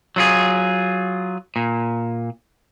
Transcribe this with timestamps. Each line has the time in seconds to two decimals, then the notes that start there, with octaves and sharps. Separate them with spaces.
0.16 F#3 F4 G#4
1.56 A#2